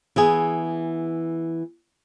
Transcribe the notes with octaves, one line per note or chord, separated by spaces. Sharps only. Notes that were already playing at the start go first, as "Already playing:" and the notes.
E3 B3 G#4